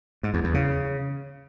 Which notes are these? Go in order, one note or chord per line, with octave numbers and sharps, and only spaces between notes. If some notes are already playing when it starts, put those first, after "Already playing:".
G#2
E2
E2
C#3